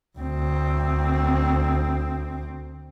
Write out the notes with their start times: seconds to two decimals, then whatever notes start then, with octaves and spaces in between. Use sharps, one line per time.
0.18 D2 C4